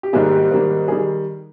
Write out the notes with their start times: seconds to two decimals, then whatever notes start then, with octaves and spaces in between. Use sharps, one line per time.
0.03 G4
0.13 G#2 D#3 G3 A#3 G#4
0.31 G4
0.50 G#2 D#3 G3 A#3
0.88 D#3 G3 G#4